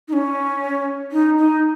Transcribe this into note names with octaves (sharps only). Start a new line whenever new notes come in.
D#4
C#4
D#4
D#4